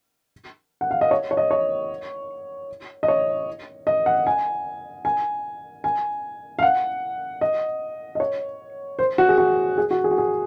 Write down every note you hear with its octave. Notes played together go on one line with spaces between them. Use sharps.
F#5
F5
D#5
C#5
C#5
D#5
C#5
D#5
C#5
D#5
F#5
G#5
G#5
G#5
F5
F#5
D#5
D#5
C#5
C5
F#4
G#4
F#4
G#4
F#4
G#4
F#4
G#4